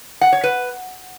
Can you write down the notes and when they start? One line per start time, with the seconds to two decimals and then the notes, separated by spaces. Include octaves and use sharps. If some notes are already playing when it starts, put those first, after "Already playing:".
0.21 F#5
0.33 C#5
0.44 B4